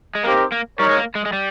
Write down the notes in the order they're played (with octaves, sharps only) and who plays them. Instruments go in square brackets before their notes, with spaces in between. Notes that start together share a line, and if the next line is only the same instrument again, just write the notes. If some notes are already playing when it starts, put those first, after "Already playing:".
[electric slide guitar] G#3
[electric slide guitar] A#3 [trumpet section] C4 D#4 G4 A#4
[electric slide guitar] A#3
[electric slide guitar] G3 [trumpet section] D#4 A#4 C#5
[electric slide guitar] G#3
A#3
G#3
G#3
G3